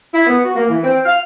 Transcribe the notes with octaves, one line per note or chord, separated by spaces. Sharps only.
E4
B3
F#4
A#3
E3
C4
F5